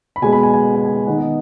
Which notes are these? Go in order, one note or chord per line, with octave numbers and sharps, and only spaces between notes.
B5
B2 G#3 B3 G#5
B5
G#5
G#5
G#5
G#5
G#5
D#3 B3 D#4 F#5
D#5